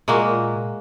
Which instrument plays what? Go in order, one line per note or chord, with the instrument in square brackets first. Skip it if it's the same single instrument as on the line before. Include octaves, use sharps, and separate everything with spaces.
[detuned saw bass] A#2 [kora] G#3 A#3 F#4